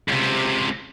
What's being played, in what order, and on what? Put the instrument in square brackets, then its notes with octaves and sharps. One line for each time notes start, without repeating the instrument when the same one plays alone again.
[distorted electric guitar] C#2 C3